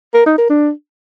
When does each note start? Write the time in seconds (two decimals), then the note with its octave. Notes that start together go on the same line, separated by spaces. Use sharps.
0.14 A#4
0.26 D#4
0.38 A#4
0.50 D4